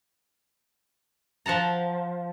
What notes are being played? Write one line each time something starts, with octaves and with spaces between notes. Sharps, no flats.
F3 F#5 A5 A#5